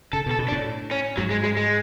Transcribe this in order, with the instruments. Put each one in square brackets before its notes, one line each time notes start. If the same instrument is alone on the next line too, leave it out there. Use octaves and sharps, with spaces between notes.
[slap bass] C#3 [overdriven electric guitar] A4
[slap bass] B2
[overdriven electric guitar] A4
[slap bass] B2
[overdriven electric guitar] D4
[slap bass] A2
[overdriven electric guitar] C#4
[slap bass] G#2 [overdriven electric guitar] F#3
[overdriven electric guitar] G#3
G#3
G#3